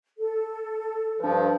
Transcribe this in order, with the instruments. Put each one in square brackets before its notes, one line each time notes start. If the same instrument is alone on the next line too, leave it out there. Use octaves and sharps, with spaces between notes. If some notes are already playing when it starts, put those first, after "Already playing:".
[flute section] A4
[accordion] G2 F3 [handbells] D4 B4